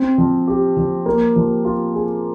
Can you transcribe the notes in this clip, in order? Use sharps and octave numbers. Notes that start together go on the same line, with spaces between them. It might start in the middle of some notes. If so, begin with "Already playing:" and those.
Already playing: C4
F3
G4
F3
A#3
F3
F4
G#4